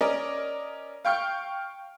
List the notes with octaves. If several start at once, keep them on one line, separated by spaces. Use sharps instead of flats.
C#4 A#4 D5 D#5
F5 G5 C#6 F6 G6